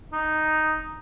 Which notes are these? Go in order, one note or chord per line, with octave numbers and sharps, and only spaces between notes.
D#4